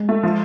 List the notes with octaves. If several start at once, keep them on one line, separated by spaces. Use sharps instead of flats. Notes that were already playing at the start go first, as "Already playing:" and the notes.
Already playing: G#3
A3
F3